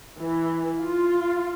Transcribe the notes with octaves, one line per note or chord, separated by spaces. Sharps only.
E3
F4